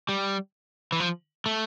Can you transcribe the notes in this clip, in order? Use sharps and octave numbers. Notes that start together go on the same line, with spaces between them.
G3
E3
F3
A3